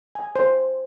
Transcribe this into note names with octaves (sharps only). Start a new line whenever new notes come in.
G#5
C5